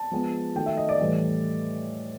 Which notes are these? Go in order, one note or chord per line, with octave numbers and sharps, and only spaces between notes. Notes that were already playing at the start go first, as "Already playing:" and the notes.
Already playing: A5
F3 G#3 B3
D#3 F#3 A3 G5
E5
D#5
D5
A2 E3 G3